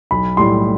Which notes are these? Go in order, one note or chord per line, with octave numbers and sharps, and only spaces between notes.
B1 B5
A2 G3 C6